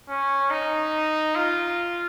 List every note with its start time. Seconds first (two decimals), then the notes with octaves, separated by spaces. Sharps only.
0.08 C#4
0.50 D#4
1.35 F4